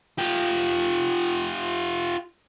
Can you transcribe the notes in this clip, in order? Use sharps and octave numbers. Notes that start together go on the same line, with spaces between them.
F4 G4